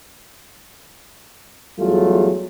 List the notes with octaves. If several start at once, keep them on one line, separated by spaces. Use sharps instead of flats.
E2 F#3 G3 A3 F4 G#4